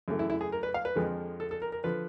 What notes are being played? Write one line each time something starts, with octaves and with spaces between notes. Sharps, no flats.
F#2 C#3 E3 A3
E4
E4
G#4
A#4
B4
F5
B4
F2 D3 F3 G#3
A4
A4
A#4
A#4
D3 F3 B4